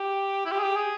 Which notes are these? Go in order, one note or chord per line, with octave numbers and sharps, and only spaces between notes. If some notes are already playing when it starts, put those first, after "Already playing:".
Already playing: G4
E4
G4
G#4
G4
G#4